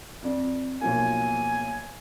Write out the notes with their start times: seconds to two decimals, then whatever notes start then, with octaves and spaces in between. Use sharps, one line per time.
0.22 F2 D5
0.81 B1 F3 A#3 G#5